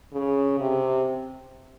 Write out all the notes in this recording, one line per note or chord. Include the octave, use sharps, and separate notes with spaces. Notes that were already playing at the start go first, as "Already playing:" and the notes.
C#3
C3